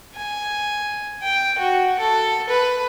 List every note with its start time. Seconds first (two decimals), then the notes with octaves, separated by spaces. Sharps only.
0.16 G#5
1.22 G5
1.58 F#4
1.99 A4
2.49 B4